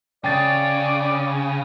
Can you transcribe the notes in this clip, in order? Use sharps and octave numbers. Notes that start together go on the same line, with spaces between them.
C#3 D5 G5 A6